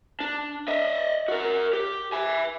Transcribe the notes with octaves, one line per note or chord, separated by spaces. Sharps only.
D4
D#5 E5
F#4 A#4
G4
E5 G#5